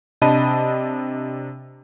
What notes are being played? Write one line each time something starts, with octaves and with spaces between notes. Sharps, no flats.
C3 D4 D#5 A5 B5 D#7